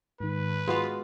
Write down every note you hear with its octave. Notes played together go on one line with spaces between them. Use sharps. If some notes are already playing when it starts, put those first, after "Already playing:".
G#2 D#3 B4
G#3 B3 F4 F#4 F5